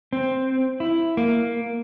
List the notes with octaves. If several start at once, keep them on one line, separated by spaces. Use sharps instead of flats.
C4
E4
A#3